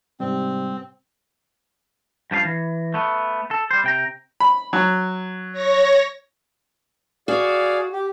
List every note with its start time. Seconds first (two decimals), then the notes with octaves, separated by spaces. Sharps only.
0.20 G#2 C3 G3 C4
2.31 G2 F3 G4 F5
2.45 E3
2.94 A3 B3
3.51 A4
3.71 G3 C5
3.84 C3 G5 A#5
4.40 B5
4.73 F#3
5.52 C#5 A#6
7.28 F#4 G#4 D5 F5
7.92 G4